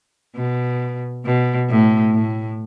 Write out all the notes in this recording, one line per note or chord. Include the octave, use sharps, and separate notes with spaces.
B2
B2
A2
A2